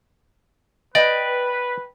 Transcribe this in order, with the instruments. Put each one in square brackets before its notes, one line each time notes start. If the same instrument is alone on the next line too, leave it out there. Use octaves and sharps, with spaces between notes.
[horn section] B4 [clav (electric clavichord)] D5 [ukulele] D#5 G5